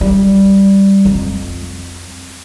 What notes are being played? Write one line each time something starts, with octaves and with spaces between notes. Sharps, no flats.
G3
F2